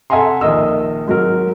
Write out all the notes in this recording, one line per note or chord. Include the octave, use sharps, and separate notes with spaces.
A4 E5 F#5 G#5 A#5 C6
A#1 D#3 A#3 D#5 E6
G#2 F#3 A#4